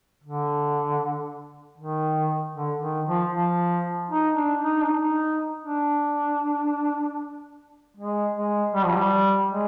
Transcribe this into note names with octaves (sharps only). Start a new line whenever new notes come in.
D3
D#3
D3
D#3
F3
F3
D#4
D4
D#4
D4
D#4
D4
G#3
G#3
G3
F3
G3
G#3